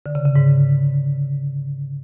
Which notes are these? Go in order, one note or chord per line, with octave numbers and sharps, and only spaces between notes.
D3
C#3
C#3
G#2